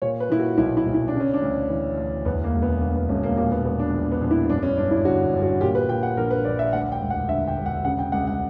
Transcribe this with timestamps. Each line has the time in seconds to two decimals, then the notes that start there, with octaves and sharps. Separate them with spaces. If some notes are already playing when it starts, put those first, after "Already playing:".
0.02 A#2 C#5
0.20 B4
0.30 A#2 E4
0.39 F#4
0.58 B1 E4
0.77 E4
0.86 B1
0.94 E4
1.08 D4
1.13 C#3
1.20 C#4
1.33 D4
1.42 D2
1.70 E3
1.98 D2
2.25 E2 B3
2.44 A#3
2.54 E1
2.62 B3
2.81 D3 A#3
2.96 B3
3.09 E1 C#4
3.23 A#3
3.37 A#2 A#3
3.51 B3
3.65 A#2 B3
3.79 D4
3.94 A#1
4.12 B3
4.21 A#1
4.31 E4
4.49 F#2 D4
4.63 C#4
4.77 G1 D4
4.91 E4
5.05 D3 F#4
5.33 G1
5.42 F#4
5.61 A#2 G4
5.75 B4
5.89 A#2 G5
6.03 F#5
6.17 A#1 A#4
6.31 B4
6.45 A#1 D5
6.59 E5
6.73 D2 F#5
6.92 G5
7.01 E1
7.10 F#5
7.28 D3 E5
7.48 G5
7.57 E1
7.66 F#5
7.85 C#3 F#5
7.99 G5
8.12 C#2 F#5
8.27 F#5